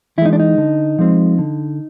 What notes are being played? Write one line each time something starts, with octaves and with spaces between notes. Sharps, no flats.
E3 G#3 D#4 E4
D4
D#4
D3
F3 G#3 C4
D3